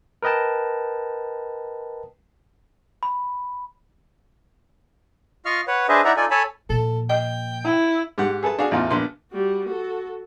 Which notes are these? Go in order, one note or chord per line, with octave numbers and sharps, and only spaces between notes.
A#4 B4 D#5 G5 A5
B5
F4 D#5 F5 C#6 F6
B4 C#5 F#5
D4 G#4 B4 C5 D#5 E5
D#4 E4 D5 E5 F#5 A#5
D#4 F4 A4 D5 G#5
A4 C#5 G#5 A5 B5
A#2 F3 A4
D#5 G5
E4
G#2 G4 F#5 F#6
G#4 A4 B4 A5
D4 F#4 G#4 F5
A1 E2 D#4 F4
A#1 B3 C6
G3 F#4
F#4 A4